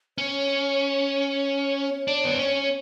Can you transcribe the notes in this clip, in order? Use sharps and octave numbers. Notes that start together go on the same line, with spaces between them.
C#4 C#5
D4
B3
C4
C#4